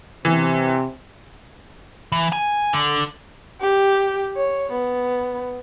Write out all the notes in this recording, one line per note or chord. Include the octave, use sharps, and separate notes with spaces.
C3 E3
E3
G#5
D3
G4
C#5
B3